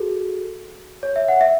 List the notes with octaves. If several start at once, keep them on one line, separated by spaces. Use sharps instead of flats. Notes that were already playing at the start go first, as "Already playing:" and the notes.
Already playing: F#4 G#4 A4
C#5
E5
F#5
E5